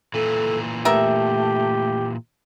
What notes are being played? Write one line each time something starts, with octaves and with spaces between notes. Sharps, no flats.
A#2 E3 A4
A3 B3 G4 A#4 E5